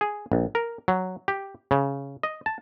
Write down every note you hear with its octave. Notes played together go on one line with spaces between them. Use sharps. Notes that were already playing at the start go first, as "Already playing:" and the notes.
G#4
A#1
A#4
F#3
G4
C#3
D#5
A5